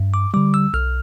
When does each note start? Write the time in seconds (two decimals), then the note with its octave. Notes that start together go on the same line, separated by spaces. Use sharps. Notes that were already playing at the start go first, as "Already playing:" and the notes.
Already playing: G2
0.14 D6
0.34 D3 G3 D6
0.54 E6
0.74 B1 F6